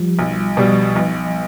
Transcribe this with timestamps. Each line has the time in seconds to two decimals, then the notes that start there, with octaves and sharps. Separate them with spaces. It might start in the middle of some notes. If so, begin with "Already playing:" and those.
Already playing: F3 G3
0.19 B1
0.57 B2 G3
0.96 B1